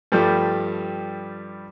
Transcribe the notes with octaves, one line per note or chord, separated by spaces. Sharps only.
G2 F3 G3 A3